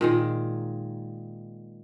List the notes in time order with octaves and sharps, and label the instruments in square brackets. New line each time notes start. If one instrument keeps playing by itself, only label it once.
[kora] A#2 D#3 G#3